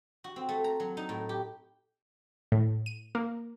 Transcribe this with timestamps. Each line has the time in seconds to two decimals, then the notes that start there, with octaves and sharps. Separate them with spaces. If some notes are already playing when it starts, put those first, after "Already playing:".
0.24 F#4
0.36 C4
0.49 A3
0.64 A#5
0.80 F#3
0.97 D#4
1.09 A2
1.29 G4
2.52 A2
2.86 D#7
3.15 A#3